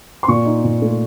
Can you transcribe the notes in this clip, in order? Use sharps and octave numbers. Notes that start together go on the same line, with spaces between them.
C6
A#2 C#6
D#4
A#2
A3